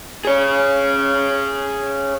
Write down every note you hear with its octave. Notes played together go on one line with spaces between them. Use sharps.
G#4 C#5